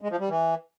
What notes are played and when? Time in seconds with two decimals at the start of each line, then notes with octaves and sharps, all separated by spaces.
0.01 G#3
0.11 F3
0.20 G3
0.29 E3